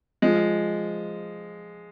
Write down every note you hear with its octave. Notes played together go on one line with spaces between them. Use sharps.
F3 G#3